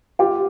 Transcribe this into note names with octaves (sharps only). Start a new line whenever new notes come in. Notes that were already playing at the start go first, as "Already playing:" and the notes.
F4 G4